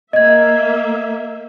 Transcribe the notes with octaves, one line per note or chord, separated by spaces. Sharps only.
A#3 D#5 E5 G#6